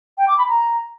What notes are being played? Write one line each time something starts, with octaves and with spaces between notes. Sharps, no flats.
G5
D6
B5
A#5